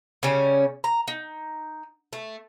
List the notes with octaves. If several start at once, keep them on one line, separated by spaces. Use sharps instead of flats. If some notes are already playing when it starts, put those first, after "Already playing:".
C#3 G3 C#4
A#5
D#4
A3